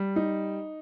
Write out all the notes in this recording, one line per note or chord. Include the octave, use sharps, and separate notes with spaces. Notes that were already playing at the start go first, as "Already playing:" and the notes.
Already playing: G3
D#4